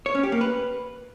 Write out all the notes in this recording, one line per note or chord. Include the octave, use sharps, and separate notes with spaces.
C#5
C#4
G4
A#3
B4